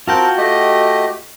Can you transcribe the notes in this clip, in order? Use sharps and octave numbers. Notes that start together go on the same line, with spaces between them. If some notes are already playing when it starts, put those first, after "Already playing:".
C4 F4 F#4 A#4 G5 A5
A3 G4 D#5